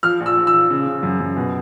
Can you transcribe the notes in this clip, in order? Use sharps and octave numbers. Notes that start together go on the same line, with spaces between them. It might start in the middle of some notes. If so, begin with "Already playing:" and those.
F3 F6
A#1
E6
A#1
E6
F3
C#3
C#3
F#2
F#2
B2